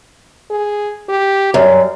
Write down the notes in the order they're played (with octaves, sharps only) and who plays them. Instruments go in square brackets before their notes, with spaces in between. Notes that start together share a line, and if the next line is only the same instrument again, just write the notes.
[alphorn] G#4
G4
[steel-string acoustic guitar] F#2 [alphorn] G3